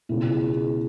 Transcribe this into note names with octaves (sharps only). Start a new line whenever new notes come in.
C#2 B2 E4
G#4
G#4